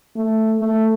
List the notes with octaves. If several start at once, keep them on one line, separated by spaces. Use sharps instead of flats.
A3
A3